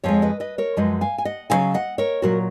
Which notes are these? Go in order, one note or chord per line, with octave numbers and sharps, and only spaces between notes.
F2 F3 G#3 C#5 F5
B4 D#5
B4 D#5
A#4 C#5
F#2 F3 G#3 B4 D#5
F5 G#5
G#5
D#5 F#5
F#2 C#3 F#3 F5 G#5
D#5 F#5
A#4 C#5
A#2 F#3 F#4 A#4